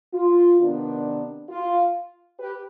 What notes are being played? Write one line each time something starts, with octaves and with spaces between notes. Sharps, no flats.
F4
C3 D#3 B3 D4
F4
G4 B4